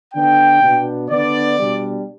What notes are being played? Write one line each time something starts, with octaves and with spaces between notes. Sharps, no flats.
D3 B3 D4 G5
B2 B3 D4
D3 B3 D4 D5
B2 G3 D4